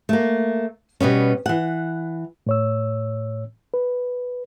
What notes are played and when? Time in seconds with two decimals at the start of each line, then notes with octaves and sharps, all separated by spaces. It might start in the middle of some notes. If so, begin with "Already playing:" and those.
0.09 A3 A#3
1.00 B2 G3 B3 C#4
1.46 E3 F#5
2.47 A2 C#5 E6
3.74 B4